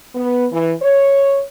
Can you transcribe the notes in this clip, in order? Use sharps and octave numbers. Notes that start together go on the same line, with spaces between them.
B3
E3
C#5